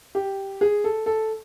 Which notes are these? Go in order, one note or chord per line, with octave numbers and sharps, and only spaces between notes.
G4
G#4
A4
A4